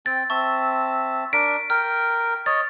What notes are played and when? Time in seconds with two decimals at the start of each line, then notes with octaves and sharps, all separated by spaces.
0.06 C4 G5 A6
0.30 C4 E5 A5 C#6
1.33 D4 A#4 B6 D7
1.70 A#4 G5 F6
2.46 C#5 D#5 A6